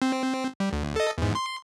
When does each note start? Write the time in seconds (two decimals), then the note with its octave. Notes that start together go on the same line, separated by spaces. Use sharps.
0.02 C4
0.60 G3
0.73 D2
0.96 A4 D#5
1.18 E2 G#2
1.35 C6